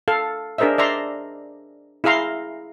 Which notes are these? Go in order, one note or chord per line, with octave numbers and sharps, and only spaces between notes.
A4 F5
D4 G#4 A#4 C5 D#5 E5
D5 E5 A#5 C6
E4 G#4 E5 F5 A#5 C6